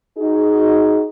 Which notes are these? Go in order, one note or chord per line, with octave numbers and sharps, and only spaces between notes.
D#4 F#4 G#4